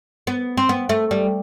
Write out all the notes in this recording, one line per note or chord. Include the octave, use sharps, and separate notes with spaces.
B3
C4
B3
A3
G3